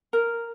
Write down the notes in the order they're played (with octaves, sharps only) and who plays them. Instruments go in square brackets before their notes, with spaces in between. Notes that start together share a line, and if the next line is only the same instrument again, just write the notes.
[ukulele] A#4